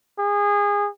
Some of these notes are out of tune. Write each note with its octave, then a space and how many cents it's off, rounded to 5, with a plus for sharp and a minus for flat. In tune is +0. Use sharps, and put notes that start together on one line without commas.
G#4 -25